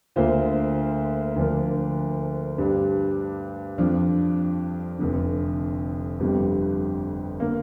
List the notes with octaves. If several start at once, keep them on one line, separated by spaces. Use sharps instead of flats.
D2 D3 A#3 F4 C5
D2 D3 F3 D4 A#4
G2 G3 D4
F2 F3 D4
F1 F2 D3
G1 F2 D3 G3
D3 A#3